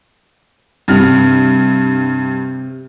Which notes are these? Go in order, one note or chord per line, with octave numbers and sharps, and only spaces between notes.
G2 C3 F6